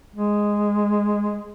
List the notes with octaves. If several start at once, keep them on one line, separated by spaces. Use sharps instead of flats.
G#3